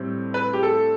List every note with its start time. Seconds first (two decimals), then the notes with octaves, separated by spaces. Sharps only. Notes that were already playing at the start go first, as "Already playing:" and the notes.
Already playing: A2 G3 C4
0.34 B4
0.53 G4
0.63 A4